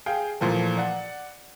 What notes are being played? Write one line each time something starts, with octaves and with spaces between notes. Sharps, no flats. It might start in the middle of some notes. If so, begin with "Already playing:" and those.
G#4 F5 G5
A#2 E3 F3 A3
D5 F#5